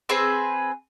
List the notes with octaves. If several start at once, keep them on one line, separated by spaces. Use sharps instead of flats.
C4 G#4 B4 C5